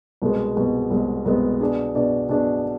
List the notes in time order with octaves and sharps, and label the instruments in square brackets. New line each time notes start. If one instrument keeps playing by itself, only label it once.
[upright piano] C2 B2 G#3 B3
C2 B2 G#3 B3
C2 B2 G#3 B3
C2 B2 G#3 B3
B2 B3 D4 G#4 D5
B2 B3 D4 G#4 D5
B2 B3 D4 G#4 D5